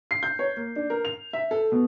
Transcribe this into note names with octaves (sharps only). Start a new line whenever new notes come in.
C7
G6
C#5
A#3
D4
A#4
F7
E5
A4
B2